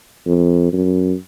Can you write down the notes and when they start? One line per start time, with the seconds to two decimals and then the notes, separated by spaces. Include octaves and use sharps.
0.27 F2
0.73 F#2